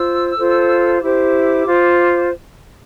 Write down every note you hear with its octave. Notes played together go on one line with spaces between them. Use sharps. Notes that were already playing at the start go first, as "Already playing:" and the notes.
Already playing: F4 C5 E6
F4 A4 C5
E4 G4 C5 D6
F4 C5